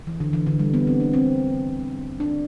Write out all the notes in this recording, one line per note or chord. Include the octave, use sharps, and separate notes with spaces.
E3
D3
E3
D3
G3
B3
C4
D4
C4
D4